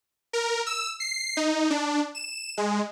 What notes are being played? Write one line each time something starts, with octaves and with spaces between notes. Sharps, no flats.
A#4
E6
C7
D#4
D4
E7
G#3